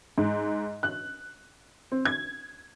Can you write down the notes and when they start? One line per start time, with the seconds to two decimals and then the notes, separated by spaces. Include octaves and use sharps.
0.18 G#2
0.83 F#6
1.92 C4
2.05 G#6